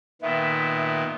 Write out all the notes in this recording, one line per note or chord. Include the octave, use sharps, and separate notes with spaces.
A#2 D#3 B3 E5